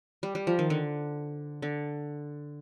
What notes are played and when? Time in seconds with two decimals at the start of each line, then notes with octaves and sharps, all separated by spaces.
0.23 G3
0.35 G3
0.47 F3
0.59 D#3
0.70 D3
1.62 D3